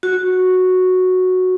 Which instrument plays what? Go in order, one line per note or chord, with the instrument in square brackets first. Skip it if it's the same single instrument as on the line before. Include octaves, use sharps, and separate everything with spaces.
[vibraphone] F#4